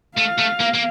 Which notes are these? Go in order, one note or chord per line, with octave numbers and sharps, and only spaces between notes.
A3 F5
A3
A#3
A#3